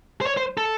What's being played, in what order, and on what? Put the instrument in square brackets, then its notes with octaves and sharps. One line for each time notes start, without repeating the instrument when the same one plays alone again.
[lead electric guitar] C5
C#5
C5
A4